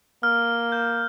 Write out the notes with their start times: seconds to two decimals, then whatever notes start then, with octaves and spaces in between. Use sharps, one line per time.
0.23 A#3 F6
0.72 G6